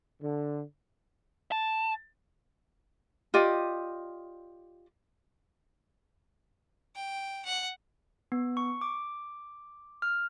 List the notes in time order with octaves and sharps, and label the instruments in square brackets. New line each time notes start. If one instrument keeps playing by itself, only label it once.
[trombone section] D3
[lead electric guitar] A5
[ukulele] F4 G4 D5 D#5
[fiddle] G5
F#5
[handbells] B3
C#6
D6
F6